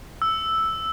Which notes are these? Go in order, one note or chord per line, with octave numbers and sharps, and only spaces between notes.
E6